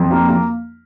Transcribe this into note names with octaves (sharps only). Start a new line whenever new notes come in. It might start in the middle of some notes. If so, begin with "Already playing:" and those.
Already playing: F2
A#3
A#3